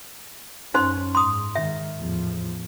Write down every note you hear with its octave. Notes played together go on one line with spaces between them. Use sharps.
F#2 C#4 D#4 C5 C6
G#2 C6 D#6
G#2 D#3 E5
E2 A2 F3